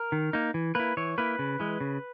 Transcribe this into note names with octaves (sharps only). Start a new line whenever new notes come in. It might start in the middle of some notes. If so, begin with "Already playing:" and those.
Already playing: A#4
D#3
A#3 D#4
E3
A#3 E4 B4
E3 C#5
A#3 E4 B4
C#3
E3 G#3
C#3